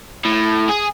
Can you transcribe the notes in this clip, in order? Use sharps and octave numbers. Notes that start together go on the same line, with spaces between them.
A2
G#4